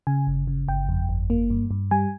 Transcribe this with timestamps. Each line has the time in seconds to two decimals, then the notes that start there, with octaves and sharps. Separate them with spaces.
0.07 C#3 G#5
0.27 G1
0.48 C#3
0.68 G1 G5
0.89 F2
1.09 G1
1.30 A#3
1.50 G2
1.71 G2
1.91 G3 G#5